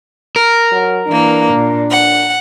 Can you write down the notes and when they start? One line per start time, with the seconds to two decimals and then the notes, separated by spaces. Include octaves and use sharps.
0.36 A#4
0.72 F#3
1.08 E3 A#3 D4
1.53 A#2
1.91 F#5